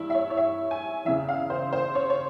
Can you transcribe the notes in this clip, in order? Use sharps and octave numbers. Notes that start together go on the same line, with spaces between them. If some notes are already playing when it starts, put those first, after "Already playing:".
Already playing: G2 E3 E4
E5
C#5
C#5
E5
G#5
E2 C#3 E3 E5
F5
C5
C5
C#5
C#5